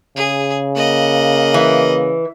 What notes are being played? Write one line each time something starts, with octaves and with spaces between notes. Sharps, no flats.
C#3 G#4
A#3 D#5 F#5
E3